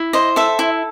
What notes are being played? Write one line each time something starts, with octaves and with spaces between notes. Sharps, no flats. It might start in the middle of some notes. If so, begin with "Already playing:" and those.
Already playing: E4
C5 D#5
A4 E5
E4